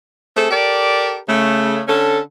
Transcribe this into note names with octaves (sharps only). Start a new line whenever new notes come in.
A3 C4 G#4 A4
G4 A4 A#4 D5
C#3 A3
D3 C#4 A4